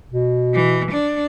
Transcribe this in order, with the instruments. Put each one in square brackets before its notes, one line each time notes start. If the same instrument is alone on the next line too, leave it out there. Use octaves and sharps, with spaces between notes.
[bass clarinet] B2
[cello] E3
D4